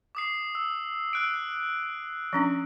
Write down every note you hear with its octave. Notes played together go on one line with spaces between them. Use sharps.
D6 D#6 C7
E6
E6 F#6 D7
F3 C#4 D4